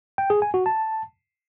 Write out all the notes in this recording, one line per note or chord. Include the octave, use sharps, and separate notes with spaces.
G5
G#4
G#5
F#4
A5